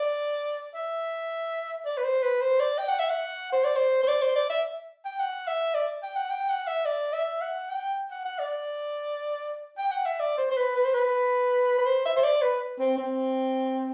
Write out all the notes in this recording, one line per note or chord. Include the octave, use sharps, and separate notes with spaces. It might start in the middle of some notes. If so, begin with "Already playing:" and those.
Already playing: D5
E5
D5
B4
C5
B4
C5
D5
G5
F#5
E5
F#5
C5
D5
C5
C5
D5
C5
D5
E5
G5
F#5
E5
D5
G5
F#5
G5
F#5
E5
D5
E5
F#5
G5
F#5
F#5
D5
G5
F#5
E5
D5
C5
C5
B4
B4
C5
B4
B4
C5
E5
C5
D5
B4
C4
C4